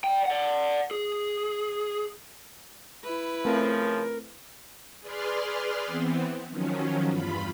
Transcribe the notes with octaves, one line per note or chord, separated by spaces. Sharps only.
D5 G5
D5 F#5
G#4
E4 B4
C#3 F3 A3 C4 A#4
G#4 B4 D5 C6 F6
E3 B3 C4
D#3 F3 F#3 C#4
E2 G2 F4 B5